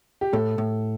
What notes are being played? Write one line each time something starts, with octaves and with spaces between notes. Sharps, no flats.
G4
A2 A4
A2